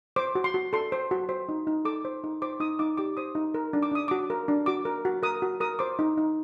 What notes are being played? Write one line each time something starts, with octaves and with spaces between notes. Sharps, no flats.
C5 D6
F#4
C6
F#4
A4 C6
C5
F#4
C5
D#4
D#4
A4 D6
C5
D#4
C5 D6
D#4 D#6
D#4 D6
G4 D6
C5 D#6
D#4
A#4
D4
D6
D4 D#6
F#4 D6
A#4
D4
F#4 D6
A#4
F#4
A#4 D#6
F#4
A#4 D#6
C5 D6
D#4
D#4